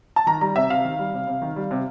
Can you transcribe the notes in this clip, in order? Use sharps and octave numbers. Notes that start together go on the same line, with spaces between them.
A5
D#3 A#5
G3 A#5
C3 E5
C3 F5
D#3
G3
C3
C3
D#3
G3
C3